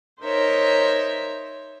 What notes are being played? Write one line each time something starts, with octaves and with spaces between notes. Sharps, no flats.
D#4 A#4 C5 C#5 E5